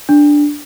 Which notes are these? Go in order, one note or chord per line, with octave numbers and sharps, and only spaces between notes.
D4